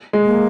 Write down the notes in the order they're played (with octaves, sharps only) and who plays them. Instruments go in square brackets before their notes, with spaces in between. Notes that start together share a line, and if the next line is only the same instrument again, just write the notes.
[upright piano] G#3
[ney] A#3